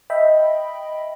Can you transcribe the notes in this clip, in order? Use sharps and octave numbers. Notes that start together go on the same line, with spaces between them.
D#5 E5 G5 B5